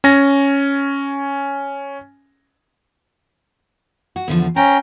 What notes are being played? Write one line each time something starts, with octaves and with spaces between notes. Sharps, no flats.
C#4 G#5 A#6
F#4
E2 D3 F3
C#4 C5 G5 A#5